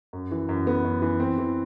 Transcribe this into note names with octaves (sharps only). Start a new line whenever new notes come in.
F#2
E3
F#2
B3
F#2
E3
C4
E3